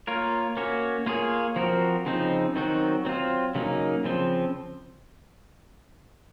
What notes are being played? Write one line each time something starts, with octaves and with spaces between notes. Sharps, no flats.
A#3 F4 A#4 C#5
A#3 C#4 F#4 C#5
A#3 F4 G#4 C#5
F3 C4 F#4 A#4
C#3 F3 C4 D#4
D#3 F#3 C4 D#4 F#4
F#3 C4 F4
C#3 F#3 A#3 D#4
C#3 F3 C4